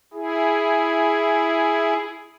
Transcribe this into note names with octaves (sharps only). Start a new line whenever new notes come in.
E4 G#4